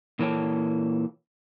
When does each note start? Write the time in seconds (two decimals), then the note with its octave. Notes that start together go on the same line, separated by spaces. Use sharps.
0.19 A#2 E3 A#3 A4 C#5 G5